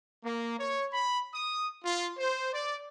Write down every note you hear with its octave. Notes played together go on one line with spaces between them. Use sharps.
A#3
C#5
B5
D#6
F4
C5
D5